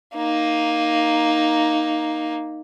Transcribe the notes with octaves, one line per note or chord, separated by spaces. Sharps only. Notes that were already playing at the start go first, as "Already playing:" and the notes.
A#3 D#4